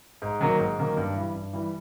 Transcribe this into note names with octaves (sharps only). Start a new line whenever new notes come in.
G#2
D#3 F#3 A#3
G#2
D#3 F#3 A#3
G2
E3 G3
G2
E3 G3